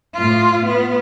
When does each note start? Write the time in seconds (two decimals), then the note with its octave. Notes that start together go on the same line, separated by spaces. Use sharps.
0.13 A2 F4
0.66 B3